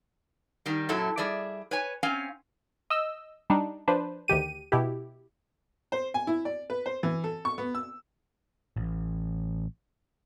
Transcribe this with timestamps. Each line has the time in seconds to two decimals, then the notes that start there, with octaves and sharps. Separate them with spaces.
0.66 D#3 G3
0.89 F#2 A#2 F#3 E4 A4
1.17 G3 G#4 D5 E5
1.71 B4 C#5 G#5
2.03 C4 C#4 F5 G#5
2.90 D#5 E6
3.50 G3 D4 D#4
3.88 F3 D4 B4 C5
4.28 D2 D#3 G4 D#7
4.72 B2 E4 G4
5.92 C5
6.14 G#5
6.27 E4
6.45 D5
6.70 B4
6.86 C5
7.03 E3
7.24 A4
7.45 C#6
7.58 B3
7.75 E6
8.77 A1